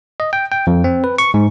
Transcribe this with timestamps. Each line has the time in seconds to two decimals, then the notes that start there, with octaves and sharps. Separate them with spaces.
0.20 D#5
0.33 G5
0.52 G5
0.67 F2
0.84 C4
1.04 B4
1.18 C#6
1.34 G#2